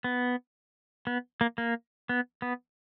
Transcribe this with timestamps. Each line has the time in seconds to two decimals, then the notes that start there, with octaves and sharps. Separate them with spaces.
0.04 B3
1.07 B3
1.41 A#3
1.58 A#3
2.09 B3
2.42 B3